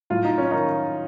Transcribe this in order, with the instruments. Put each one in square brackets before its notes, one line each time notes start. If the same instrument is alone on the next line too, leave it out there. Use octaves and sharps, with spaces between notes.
[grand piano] A2 F#3 F4
D#4
C#4
D#3 D#4